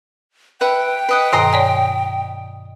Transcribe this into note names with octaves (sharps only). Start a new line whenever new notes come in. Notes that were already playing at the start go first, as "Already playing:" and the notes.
B4 E5 F#5 G5
B4 D#5 F#5
G2 B2 D#3 D#5 A#5 C6
C#5 D5 G#5